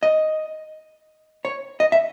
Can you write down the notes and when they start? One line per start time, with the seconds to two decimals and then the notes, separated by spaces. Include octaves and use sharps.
0.03 D#5
1.45 C#5
1.80 D#5
1.92 E5